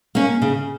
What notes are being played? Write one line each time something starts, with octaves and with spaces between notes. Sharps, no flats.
A#3 C#4
C#3